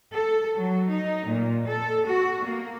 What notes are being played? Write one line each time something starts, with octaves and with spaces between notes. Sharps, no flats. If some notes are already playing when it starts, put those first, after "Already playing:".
A4
F#3
D#4
A#2
A4
F#4
A#3